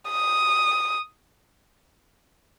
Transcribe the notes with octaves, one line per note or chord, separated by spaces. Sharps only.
D#6